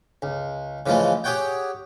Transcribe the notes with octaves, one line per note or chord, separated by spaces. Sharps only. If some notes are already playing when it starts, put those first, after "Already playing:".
C#2
C#3 E3 F3 G#3 A3
G4 G#4 C#5 F#5 G5